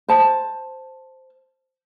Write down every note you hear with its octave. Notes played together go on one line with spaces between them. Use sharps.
C5 A5